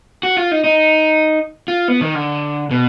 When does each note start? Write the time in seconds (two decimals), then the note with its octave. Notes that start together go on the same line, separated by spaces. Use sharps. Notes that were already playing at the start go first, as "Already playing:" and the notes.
0.23 F#4
0.37 F4
0.51 D#4
0.64 D#4
1.68 F4
1.88 B3
2.01 D#3
2.15 D3
2.71 B2